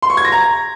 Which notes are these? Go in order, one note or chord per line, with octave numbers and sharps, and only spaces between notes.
C6
C#6
G#6
A#6
A#5